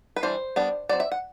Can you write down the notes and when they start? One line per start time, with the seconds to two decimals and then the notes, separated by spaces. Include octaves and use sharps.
0.16 B4
0.23 E3 G3 D4 C5
0.56 G3 B3 D4
0.89 F#3 C4 D5
1.00 E5
1.12 F#5